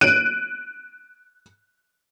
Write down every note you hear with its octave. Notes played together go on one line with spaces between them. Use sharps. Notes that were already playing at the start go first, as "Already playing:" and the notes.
F#6 D7 D#7